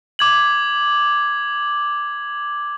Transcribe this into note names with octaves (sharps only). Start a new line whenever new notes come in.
D6 G#6 F#7